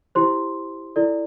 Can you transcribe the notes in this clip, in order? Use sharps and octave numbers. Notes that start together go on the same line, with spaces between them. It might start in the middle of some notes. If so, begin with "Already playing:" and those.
E4 G4 C5 C6
E4 A4 D5